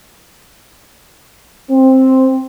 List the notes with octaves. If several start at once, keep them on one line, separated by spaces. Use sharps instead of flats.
C4